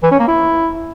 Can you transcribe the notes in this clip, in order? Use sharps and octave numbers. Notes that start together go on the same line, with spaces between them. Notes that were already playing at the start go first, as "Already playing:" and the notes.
E3
C#4
A#3
E4